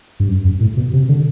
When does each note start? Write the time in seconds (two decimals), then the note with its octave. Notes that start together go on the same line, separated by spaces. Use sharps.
0.20 G2
0.28 F#2
0.45 F#2
0.61 A2
0.77 B2
0.93 C3
1.09 D3